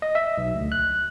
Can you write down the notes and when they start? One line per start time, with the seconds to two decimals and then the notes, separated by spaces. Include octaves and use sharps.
0.02 D#5
0.15 E5
0.38 B1
0.55 D2
0.72 F#6